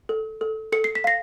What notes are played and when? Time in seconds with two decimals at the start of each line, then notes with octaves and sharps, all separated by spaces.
0.09 A4
0.41 A4
0.72 A4 C#7
0.84 C7
0.95 B6
1.04 F5 A#6 C7